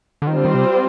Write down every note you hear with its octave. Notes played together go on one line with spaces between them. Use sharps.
D3
D#3 G3 C4 F4 C5
D3
D#3
C3